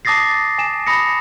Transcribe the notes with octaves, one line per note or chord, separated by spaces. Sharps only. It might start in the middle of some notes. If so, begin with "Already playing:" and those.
A5 D6 D#6 A6 A#6 C7
G#5 E7
B5 D#6 A#6 C#7